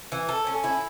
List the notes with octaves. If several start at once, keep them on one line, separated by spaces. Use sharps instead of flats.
E3
A4
C#4
E4